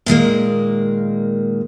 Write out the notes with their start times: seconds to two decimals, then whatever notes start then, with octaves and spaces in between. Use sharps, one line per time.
0.06 A#2 D#3 G#3 A#3